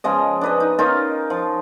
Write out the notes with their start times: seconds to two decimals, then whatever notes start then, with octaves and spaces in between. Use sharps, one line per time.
0.04 C#3 F3 G#3 D#5
0.41 D4 B4 D#5
0.60 D#4
0.79 C#4 D#4 F4 A#4
1.30 F3